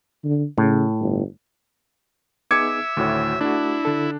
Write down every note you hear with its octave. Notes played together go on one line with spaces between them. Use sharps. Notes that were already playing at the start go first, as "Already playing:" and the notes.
D3
A2 C#3
G1
B3 D#4 G#4 E5 D6 G#6 C#7
D2 A2 D#3 F#4 C#5
A3 D4 E4 F#4
D3 A4